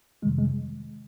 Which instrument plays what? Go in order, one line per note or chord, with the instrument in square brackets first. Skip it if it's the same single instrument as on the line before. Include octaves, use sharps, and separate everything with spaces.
[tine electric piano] F2 C3 D#3 G3 G#3
G#3